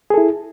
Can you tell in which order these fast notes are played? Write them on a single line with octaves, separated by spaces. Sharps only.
G#4 A4 E4